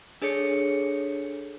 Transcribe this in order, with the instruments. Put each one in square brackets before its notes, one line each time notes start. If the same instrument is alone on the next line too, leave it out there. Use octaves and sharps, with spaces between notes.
[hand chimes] D4 G#4 A4 C#5 C#7